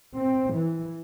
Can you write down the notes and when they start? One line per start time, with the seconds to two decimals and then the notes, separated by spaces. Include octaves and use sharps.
0.15 C4
0.54 E3